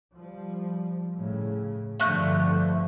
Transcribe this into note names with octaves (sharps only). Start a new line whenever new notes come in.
F3 G3
A2 C#3
G2 D3 F3 A3 F#6 G6